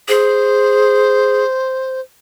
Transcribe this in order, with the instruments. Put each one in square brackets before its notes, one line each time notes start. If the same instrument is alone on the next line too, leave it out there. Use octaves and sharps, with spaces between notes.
[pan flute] G#4 [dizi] C5